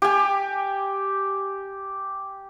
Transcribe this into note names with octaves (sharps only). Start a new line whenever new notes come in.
G4 G#5